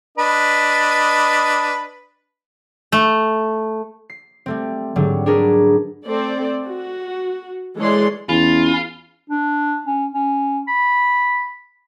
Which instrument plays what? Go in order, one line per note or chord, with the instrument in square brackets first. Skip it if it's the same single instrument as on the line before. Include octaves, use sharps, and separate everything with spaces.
[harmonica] D4 B4 D#5
[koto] A3
[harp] C7
G3 A3 C4
G#2 D3 F#3 G3
D4 F#4 G#4 A#4 B4
[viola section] A3 C4 A4 D5
F#4
E3 G#3 A4 C#5 D5 C6
[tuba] E2 [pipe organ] C#4 E4 [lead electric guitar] F4
[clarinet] D4
C#4
C#4
B5